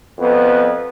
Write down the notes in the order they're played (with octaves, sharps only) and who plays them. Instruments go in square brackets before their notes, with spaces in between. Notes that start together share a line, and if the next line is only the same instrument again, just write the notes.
[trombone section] F2 B3